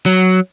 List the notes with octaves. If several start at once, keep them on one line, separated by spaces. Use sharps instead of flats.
F#3